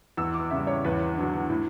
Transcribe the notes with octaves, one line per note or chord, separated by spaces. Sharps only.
E2 E6
D6
C#3 G3 E5
C#5
E2 B4
D3 F#3
A2